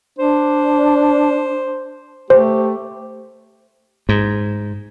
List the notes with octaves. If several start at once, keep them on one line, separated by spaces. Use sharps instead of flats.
D4 C5
A3 G4 C5
G#2